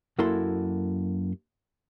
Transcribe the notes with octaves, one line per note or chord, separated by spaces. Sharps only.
F#2 A#3 E4 F#4 A4 C6